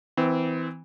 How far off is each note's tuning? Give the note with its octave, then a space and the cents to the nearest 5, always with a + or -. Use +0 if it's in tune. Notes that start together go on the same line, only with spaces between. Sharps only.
E3 -15 C4 -30